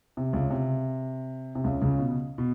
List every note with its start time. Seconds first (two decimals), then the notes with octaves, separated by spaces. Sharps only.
0.17 C3
0.33 C#2 C#3
0.51 C3
1.55 C3
1.64 C#2 C#3
1.81 C#2 C#3
1.98 B2
2.38 B2